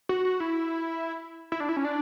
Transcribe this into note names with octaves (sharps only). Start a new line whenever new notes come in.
F#4
F#4
E4
E4
D4
E4
C#4
D4